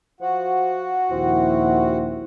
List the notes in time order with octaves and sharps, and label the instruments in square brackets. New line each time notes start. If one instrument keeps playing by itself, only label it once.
[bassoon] F3 [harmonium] F#4
[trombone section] A#1 D#2 E4 [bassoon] C4